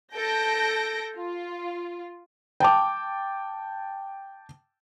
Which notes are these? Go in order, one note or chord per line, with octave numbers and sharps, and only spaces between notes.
A4 G6 A#6 D7
F4
G5 A5 D6